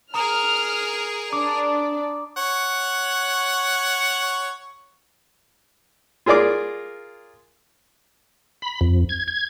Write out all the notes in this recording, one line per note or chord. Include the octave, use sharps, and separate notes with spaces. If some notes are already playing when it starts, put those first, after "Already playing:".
G#4 A#4 A#5 D#6 F6
D4 D5 D6
C#5 F#5
F4 G#4 A#4 D5 D6
B5
F2
G#6
G#6